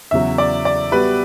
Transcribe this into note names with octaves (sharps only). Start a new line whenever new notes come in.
E2 C#3 F#3 E5
D5
D5
G3 B3 F#4 B4